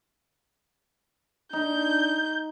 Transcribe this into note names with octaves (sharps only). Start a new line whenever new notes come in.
D4 D#4 G6